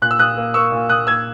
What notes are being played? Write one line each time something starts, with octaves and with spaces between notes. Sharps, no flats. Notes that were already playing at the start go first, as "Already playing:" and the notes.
A#2 F#6
E6
A#2 D#6 F#6
A#3
A#3 C#6 E6
A#2
A#2 D#6 F#6
A#3 E6 G#6